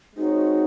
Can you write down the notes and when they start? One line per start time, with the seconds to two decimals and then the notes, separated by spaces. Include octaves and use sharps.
0.16 G#3 C4 D#4 F#4 C#5